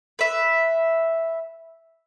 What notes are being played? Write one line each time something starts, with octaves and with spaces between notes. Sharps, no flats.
B4 E5